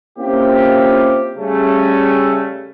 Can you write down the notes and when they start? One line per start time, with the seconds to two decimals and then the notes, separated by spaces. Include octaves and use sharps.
0.19 A#3 C4 C#4 E4 F4 G4
1.37 C#3 G3 A3 C#4